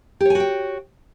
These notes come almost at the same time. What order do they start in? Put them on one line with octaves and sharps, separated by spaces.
G4 C#5 G#5 F#4 G5